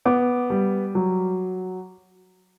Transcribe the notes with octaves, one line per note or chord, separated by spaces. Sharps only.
B3 D6
G3
F#3